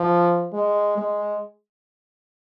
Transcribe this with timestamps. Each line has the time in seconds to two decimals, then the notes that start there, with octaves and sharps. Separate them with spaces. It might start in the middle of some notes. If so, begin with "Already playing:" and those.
Already playing: F3
0.53 G#3
0.98 G#3